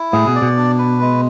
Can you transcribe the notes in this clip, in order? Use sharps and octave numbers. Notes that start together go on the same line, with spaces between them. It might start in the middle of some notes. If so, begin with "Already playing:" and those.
Already playing: E4
A2 G#4
B2
D5
B2
D4
B4
G#3